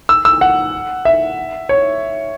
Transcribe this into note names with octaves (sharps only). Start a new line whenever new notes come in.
E6
E6
F#5
E5
C#5